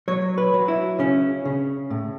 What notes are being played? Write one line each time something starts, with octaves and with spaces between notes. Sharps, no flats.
F#3 C#5
B4
F#3
E4
C#3 C#4
C#3
A2